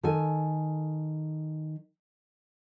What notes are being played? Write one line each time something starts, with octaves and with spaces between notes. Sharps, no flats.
D#3 A4 G#5